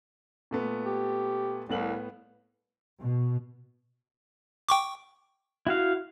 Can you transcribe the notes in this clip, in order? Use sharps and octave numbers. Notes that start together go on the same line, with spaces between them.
A#2 A3 B3
G4
C2 A2 B3 F#7
B2
G5 C#6 D6
E4 F#4 F5